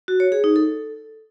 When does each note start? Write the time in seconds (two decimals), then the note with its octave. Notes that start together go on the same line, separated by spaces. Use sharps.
0.08 F#4
0.20 C#5
0.32 G#4
0.44 D#4
0.56 A4